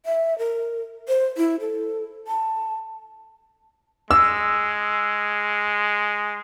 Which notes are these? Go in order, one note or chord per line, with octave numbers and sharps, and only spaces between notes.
E5
A#4
C5
E4
A4
A5
G#3 E6